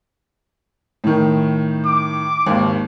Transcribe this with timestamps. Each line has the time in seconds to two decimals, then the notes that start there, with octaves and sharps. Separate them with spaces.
1.04 A2 D#3
1.86 D6
2.47 G#1 D#2